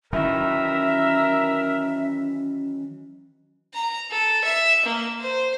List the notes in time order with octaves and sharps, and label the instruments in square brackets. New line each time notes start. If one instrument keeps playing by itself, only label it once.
[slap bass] D#3 E3 F#3 [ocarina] C#4 [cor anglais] A#4 [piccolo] E5
[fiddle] A#5
A4
E5
A#3
C5